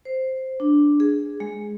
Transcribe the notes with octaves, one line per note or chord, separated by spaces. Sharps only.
C5
D4
G#4
G#3